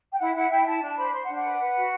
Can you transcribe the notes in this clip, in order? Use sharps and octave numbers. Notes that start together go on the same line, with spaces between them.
G5
E4 F#5
E4 F#5
E4 G5
E4 A5
D4
A5
C5 B5
C5 C6
F#5
D4
F#5
B4
B4
F#4